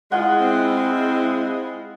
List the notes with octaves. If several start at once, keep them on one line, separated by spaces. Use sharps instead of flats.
G#3 E4 F4 F#5
C4